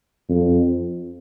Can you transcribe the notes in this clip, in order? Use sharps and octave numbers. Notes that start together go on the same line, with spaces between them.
F2